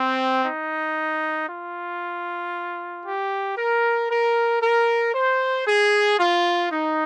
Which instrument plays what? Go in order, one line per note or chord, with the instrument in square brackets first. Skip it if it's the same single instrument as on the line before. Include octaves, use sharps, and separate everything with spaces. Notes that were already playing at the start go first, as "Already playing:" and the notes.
Already playing: [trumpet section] C4
D#4
F4
G4
A#4
A#4
A#4
C5
G#4
F4
D#4